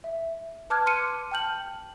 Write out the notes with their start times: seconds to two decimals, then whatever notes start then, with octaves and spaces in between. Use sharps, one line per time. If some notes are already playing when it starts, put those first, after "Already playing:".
0.04 E5
0.70 B4 A5 D6 F6 F#6 G#6
0.86 C6 D6 F6 C#7 D#7
1.31 G5 A5 F6 G6 F#7